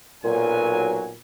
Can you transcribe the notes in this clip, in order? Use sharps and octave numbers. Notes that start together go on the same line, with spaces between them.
B1 A#2 F#3 G#5